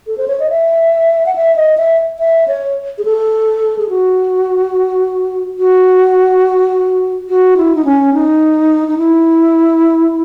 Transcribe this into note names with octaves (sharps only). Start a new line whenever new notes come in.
A4
C5
C#5
D#5
E5
F#5
E5
D#5
E5
E5
C#5
G#4
A4
G#4
F#4
F#4
F#4
E4
D#4
C#4
D#4
D#4
E4